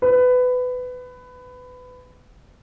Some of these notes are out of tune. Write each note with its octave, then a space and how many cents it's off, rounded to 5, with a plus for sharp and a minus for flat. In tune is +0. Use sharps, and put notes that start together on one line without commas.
B4 +20